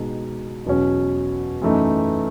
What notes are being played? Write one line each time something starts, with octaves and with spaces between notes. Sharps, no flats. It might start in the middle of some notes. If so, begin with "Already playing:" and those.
Already playing: B2 G#3 D#4
E2 B2 F#3 C#4
F#2 E3 A3 D#4